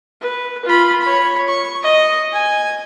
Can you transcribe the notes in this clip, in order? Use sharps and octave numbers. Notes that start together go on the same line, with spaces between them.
B4
F4 B5
C#5 B5
C#6
D#5
G#5